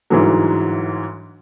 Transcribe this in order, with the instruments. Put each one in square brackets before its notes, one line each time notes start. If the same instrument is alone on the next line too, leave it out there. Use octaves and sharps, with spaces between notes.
[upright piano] G1 G#2 E3 F#3